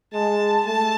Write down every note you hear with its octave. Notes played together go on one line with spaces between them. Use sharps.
G#3 A5
A3 A5